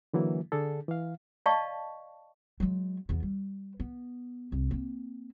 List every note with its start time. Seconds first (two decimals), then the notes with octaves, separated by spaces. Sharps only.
0.13 D3 E3 F#3 A#3 E4
0.52 D3 D4 G#4 A4
0.89 E3 F5
1.46 D5 D#5 F5 A5 C#6
2.60 F#3 G#3
3.09 E2 B3
3.23 G3
3.80 B3
4.52 C2
4.71 A#3 C4